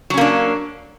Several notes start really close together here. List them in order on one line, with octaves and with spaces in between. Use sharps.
F#3 C#4 A#3 D4